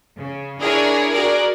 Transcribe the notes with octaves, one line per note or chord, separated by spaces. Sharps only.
C#3
D4 E4 G#4 A#4 C#5
F#4 G#4 A#4 D5